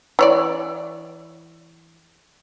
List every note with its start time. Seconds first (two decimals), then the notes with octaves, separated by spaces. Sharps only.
0.19 E3 C#5 D5